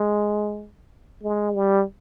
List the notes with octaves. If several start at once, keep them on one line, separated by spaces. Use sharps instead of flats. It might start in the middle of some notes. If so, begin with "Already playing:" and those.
Already playing: G#3
G#3
G3